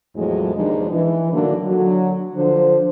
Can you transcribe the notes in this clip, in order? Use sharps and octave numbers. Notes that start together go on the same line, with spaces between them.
E2 A2 F3 F#3 G#3 A3
D#2 B2 D#3 F3 G#3 D4
E3
A2 D3 D#3 F#3 A#3 D4
D3 F#3
D3 F3 C5